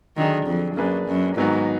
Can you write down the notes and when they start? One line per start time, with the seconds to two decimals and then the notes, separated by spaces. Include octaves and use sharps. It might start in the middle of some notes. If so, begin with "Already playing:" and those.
0.17 D3 D#3 F#3 D4 G#4
0.47 F2
0.76 F#2 A#3 D4 G#4 B4
1.07 F#2
1.37 G#2 D#3 F#3 B3 D#4 F#4